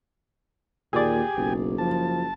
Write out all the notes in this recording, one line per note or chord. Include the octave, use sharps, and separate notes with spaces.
D#2 A#2 G4 G#4 D5 G#5
F#1 B1
F3 A5